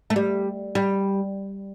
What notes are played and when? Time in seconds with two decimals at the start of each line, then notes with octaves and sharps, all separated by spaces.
0.10 A3
0.16 G3
0.75 G3